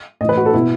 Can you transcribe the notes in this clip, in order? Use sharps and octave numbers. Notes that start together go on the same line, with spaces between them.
A2 E3 D#5
B4
F#4
A4
B2 E4